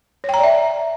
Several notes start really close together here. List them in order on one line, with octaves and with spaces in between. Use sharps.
C#5 G5 A#5 D5 E5